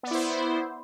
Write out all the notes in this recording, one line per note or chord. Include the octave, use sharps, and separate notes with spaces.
B3 E4 C5 D5